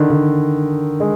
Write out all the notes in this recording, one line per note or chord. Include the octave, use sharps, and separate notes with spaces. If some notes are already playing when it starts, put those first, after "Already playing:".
Already playing: D3 D#3
D3
G#3